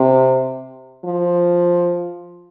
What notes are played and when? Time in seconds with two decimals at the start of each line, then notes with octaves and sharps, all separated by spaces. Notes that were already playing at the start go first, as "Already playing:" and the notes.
Already playing: C3
1.05 F3